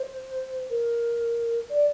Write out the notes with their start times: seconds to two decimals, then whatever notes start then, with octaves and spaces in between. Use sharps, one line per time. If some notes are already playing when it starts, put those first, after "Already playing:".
Already playing: C5
0.70 A#4
1.69 D5